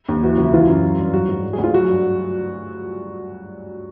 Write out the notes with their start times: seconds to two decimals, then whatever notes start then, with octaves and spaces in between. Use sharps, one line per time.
0.08 D#2
0.23 E3 F#4
0.37 C#2
0.43 E4
0.53 E3 F4
0.68 F#2
0.83 F#3
0.99 G2
1.13 F#3 F#4
1.29 G#2
1.44 F#3
1.53 D2 G#4
1.64 F4
1.74 F#3 F#4
1.89 G2